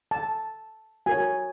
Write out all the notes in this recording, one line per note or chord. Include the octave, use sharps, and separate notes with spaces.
A5
F#4 A#4 C#5 G#5